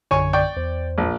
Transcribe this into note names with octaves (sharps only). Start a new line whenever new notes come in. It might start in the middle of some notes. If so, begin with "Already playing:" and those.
A#1 F#2 D3 C#5 G#5 C#6
D5 G5 C#6
E2 C5
A#1